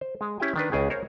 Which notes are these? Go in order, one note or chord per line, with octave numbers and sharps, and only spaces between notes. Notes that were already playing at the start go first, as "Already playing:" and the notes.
C5
G#3
C#4 E4 G4 E5 G5 G#5
D#3 D4 B4
C#2 C#3 G#4 G5
A#4 C5 C#5